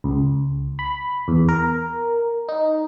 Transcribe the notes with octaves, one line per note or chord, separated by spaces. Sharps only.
C#2
B5
E2
A#4
D#4